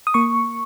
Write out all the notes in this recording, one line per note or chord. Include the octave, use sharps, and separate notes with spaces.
D#6
A#3 C#6